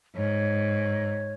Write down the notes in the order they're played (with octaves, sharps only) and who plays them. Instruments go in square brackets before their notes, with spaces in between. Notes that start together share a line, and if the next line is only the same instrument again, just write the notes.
[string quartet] G#2 [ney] C#5